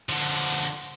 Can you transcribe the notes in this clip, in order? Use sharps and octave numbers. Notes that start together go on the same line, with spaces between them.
D3 F3